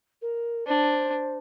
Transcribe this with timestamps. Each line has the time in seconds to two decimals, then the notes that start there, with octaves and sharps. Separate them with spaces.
0.22 A#4
0.67 D4 C5